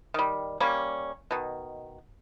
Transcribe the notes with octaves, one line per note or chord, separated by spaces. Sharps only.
D#3 G3
G3 A#3 C#4
B2 D#3